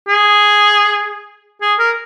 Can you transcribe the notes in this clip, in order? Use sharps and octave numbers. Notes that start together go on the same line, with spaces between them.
G#4
G#4
A#4